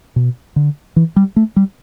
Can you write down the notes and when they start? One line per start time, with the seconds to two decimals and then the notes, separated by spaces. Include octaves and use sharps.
0.16 B2
0.56 D3
0.96 E3
1.16 G3
1.36 A3
1.56 G3